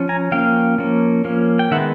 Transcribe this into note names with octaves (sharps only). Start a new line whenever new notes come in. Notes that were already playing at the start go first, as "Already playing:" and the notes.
Already playing: F3 C#4
G#5 A#5
F3 A#3 C#4 F5 G5
F3 A#3 C#4
F3 A#3 C#4
G5
D#3 G#3 B3 E5 F#5